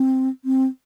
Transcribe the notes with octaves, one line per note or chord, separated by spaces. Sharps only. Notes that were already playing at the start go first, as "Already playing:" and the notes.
Already playing: C4
C4